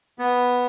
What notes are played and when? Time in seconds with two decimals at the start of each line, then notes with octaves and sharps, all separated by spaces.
0.19 B3